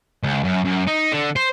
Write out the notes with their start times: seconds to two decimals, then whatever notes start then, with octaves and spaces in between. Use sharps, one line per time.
0.24 C#2
0.44 F#2
0.65 F#2
0.87 D#4
1.12 D3
1.36 C5